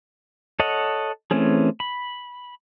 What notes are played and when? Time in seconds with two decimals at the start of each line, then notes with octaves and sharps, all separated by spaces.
0.60 A4 C#5 D#5 F#5
1.31 E3 A3 C4 C#4 G#4
1.80 B5